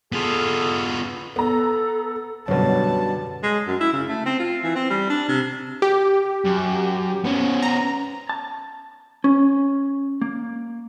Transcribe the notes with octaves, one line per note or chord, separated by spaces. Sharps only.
B3 F4 G#4 A4
B3 A4 A#5
F#2 B2 D3 F#3 G3 B4 C#5 A5
G#3
F#2
E4
C#3
A3
C4
F4
E3
C4
G3
D4
C3
G4
F#2
B3 C#4
A#5
A5
C#4
A#3